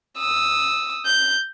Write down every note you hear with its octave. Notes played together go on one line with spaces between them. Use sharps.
D#6 E6
G6